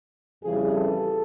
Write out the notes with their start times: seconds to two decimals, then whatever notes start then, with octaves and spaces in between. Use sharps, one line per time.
0.44 F2 C#3 E3 G3 G#4
0.73 A4